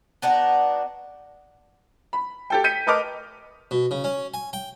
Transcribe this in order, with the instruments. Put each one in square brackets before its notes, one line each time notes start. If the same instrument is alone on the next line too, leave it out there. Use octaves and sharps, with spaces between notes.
[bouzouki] B3 D4 D#4 F#4
[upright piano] B5
G4 A4 G5
G6 B6 C#7 D#7
A#4 B4 D#5 A5 D6 F6
[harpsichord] B2
C#3
C#4
G#5
G5